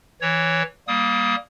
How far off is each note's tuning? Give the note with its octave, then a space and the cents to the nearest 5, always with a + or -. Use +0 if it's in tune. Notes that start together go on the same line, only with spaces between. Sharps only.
E3 +0 C#5 +0
G3 +0 A#3 +10 D#6 +20